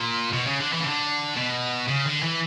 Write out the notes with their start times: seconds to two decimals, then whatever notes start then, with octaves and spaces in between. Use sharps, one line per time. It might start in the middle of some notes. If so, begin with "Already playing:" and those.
Already playing: A#2
0.33 B2
0.47 C#3
0.60 D3
0.72 E3
0.80 C#3
0.85 D3
1.37 B2
1.89 C#3
2.06 D3
2.23 E3